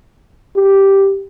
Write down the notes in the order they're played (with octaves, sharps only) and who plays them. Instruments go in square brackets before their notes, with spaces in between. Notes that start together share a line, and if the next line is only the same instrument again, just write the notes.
[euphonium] G4